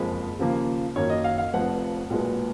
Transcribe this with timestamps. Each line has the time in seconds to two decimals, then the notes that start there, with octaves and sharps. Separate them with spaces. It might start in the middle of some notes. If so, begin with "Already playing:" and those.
Already playing: F#1 F2 F3 G#3 B5
0.39 D#2 C#3 F3 A#3
0.96 F#2 D#3 A#3 C#5
1.10 D#5
1.24 F5
1.38 F5
1.53 F1 F2 F3 B3 F#5
2.10 B1 A#2 G#3 B3